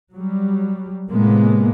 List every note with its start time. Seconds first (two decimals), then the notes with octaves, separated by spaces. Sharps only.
0.13 F#3 G3
1.11 A2 C3 G#3 A#3 B3